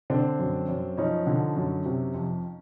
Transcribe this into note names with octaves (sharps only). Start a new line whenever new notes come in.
D3 C4 D4
F#2
F#2
F3 C#4 D#4
D3
F#2
C3
F2